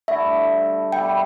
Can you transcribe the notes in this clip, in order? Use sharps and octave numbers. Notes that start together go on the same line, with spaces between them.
G2 D3 A3 E4 E5
B2 G3 E4 A4 G5